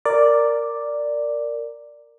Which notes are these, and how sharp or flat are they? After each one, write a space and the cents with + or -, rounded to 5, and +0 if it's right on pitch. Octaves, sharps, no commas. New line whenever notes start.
A#4 -10 D5 +0